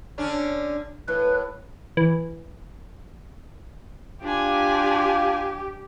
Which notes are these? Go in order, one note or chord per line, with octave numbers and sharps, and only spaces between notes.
D3 C#4 D4
A2 B4
E3
D4 F4 G4 G#5